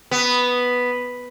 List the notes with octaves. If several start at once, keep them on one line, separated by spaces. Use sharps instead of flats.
B3